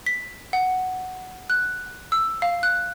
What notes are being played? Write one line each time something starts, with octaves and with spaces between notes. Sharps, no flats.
B6
F#5
F#6
E6
F5
F#6